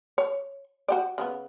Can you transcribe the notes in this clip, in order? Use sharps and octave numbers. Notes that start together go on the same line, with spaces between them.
C#5
F#4 G4 D5
C#3 G#3 B3